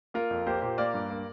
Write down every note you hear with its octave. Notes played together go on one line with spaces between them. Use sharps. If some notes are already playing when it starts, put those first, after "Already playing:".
A#3 F4 A#4
F2
A#3 G4 C5
A#2 G4 C5
A#3 A#4 D5
G2
A#3